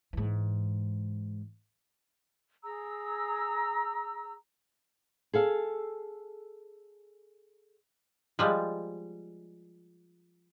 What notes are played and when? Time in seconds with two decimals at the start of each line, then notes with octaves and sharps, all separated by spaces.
0.13 G#2 E3
2.63 G#4 A#5 E6
5.33 G#4 A4 F5
8.39 F3 G3 G#3